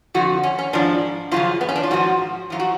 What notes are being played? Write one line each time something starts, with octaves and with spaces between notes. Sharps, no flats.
F2 D3 F3 F#4
C#4
C#4
G#2 F3 D4
F#2 C#3 F3 F4
B3
C#4
D4
F4
G#2 F3 F#4
F#2 F3 F4
F#4